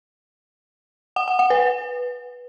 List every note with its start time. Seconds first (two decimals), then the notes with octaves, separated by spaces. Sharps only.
1.16 F#5
1.28 F#5
1.39 F#5
1.50 B4